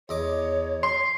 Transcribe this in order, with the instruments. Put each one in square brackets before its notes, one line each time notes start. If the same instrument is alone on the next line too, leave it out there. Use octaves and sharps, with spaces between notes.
[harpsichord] E2 D#5 D6 [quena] C#5
[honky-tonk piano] C6 [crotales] C7